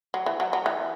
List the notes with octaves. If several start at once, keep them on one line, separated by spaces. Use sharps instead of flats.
F#3
E3
F#3
F#3
E3